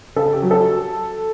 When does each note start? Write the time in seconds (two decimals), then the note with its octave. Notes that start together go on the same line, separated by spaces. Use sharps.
0.16 C#3 A4
0.33 G4
0.42 F#3
0.51 A4